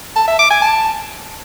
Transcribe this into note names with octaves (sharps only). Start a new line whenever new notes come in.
A5
E5
D6
G#5
A5